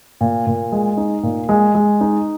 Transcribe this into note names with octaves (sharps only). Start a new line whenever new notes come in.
A#2
A#2
G#3
D#4
A#2
G#3
G#3
D#4